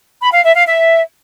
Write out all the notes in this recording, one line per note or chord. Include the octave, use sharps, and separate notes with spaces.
B5
F5
E5
F5
E5